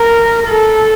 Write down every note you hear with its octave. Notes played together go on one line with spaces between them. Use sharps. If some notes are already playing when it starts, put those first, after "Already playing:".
Already playing: A#4
A4